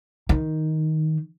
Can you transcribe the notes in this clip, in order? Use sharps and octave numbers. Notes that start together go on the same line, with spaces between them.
D#3